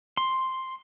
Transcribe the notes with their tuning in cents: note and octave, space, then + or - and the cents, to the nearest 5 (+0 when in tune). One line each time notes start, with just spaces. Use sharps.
C6 +5